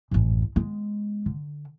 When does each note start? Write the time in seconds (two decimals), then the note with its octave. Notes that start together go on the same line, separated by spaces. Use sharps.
0.11 A1 F#2
0.56 G#3 B3
1.26 D3